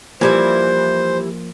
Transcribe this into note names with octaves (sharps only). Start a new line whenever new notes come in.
E3 F3 G3 A#3 C5 G#5